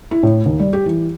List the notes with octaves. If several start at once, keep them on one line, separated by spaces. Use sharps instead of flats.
E4
A2
D#2
G3
G4
E3